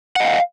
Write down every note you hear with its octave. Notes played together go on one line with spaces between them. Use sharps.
D#5 F5 F#5